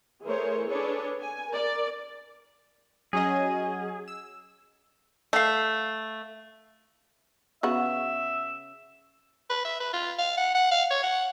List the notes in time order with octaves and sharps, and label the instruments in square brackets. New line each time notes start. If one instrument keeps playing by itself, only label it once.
[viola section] E3 A3 G#4 A#4 C5 C#5
D4 G#4 A4 B4 C#5
G#5
A#4 D5
[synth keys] F#3 C#4 D#5 [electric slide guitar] G#4
[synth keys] E6
[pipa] A3 F5
[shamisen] C#3 B3 F#4 [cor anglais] E5
[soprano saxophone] B4
E5
B4
F4
F5
F#5
F#5
F5
C#5
F#5